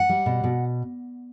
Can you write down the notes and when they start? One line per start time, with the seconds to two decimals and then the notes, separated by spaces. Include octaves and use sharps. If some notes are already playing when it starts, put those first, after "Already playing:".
Already playing: F#5
0.09 G3
0.26 B2
0.44 B2